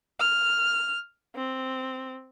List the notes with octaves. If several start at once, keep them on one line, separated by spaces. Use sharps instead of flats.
F6
C4